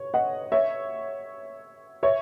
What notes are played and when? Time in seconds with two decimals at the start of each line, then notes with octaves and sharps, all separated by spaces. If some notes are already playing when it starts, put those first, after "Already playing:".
Already playing: C#5
0.14 D#5 F#5
0.52 C#5 E5
2.03 C#5 E5